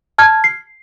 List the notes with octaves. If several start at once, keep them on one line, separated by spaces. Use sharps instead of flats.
A5 F6 G#6
C7